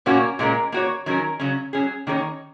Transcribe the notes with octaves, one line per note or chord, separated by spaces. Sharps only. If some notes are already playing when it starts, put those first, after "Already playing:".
A#2 A#3 C#4 F#4
A#2 G#3 C#4 A#4
A#3 F#4 C#5
D#3 F#3 C#4 A#4
C#3 F#3 C#4
F#3 C#4 G#4
D#3 A#3 C#4 A#4 C#5